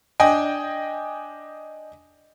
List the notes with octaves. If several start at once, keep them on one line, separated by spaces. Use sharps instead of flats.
D4 D#5 G5 G#5